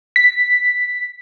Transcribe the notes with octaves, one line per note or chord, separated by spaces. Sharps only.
B6